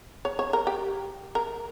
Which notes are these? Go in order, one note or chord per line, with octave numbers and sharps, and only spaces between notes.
C#5
C#5
A#4
G4
A#4